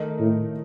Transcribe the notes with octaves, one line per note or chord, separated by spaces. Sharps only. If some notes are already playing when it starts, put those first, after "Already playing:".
Already playing: D#3 A3 D#4 A#4
A2